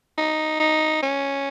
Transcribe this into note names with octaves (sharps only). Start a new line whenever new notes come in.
D#4
D#4
C#4